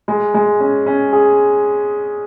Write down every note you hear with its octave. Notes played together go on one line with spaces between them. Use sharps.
G#3
G#3
C#4
C#4
G#4